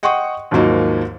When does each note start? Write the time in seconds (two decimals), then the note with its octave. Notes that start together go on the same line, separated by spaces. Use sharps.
0.03 D#5 F#5 G5 C6 C#6 D#6
0.51 D#2 G#2 F3 F#3 A#3 D#4